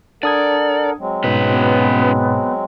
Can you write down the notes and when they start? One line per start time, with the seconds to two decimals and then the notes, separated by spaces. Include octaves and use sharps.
0.23 D4 A4 A#4 D5 F#5 D#6 G#6
0.99 F#3 G#3 C4
1.24 G#2 B2 C#4 B4
1.49 B3